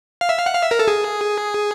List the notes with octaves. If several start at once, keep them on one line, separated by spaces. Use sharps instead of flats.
F5
E5
F5
F#5
F5
E5
A#4
A4
G#4